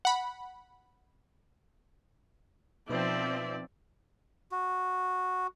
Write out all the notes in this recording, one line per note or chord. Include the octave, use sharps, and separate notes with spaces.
F#5 B5
B2 F3 C4 D#4 B4 D5 E5
F#4